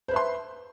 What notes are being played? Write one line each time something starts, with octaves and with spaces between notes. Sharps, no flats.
B4 C5 E5 C6